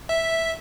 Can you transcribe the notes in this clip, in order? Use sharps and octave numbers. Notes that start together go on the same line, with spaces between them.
E5